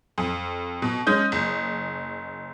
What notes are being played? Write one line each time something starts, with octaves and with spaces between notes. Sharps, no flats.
F2
B2
G#3 C#4 D#6 G6
F#1